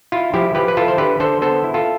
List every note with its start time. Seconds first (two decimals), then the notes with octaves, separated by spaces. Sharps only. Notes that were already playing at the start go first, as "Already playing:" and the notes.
0.12 E4 F4
0.34 F3 E4 G4
0.55 F3 G4 B4
0.68 B4
0.77 E4 F4 A4
0.88 C5
0.98 D3 G4 B4
1.20 D3 A4 C5
1.42 B3 A4 C5
1.64 E4
1.74 F4 A4